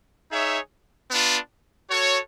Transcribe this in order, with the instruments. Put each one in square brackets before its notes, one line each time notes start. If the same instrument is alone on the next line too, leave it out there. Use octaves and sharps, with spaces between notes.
[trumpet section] D#4 G#4 C#5 E5
B3 D4 F4
F#4 A4 C#5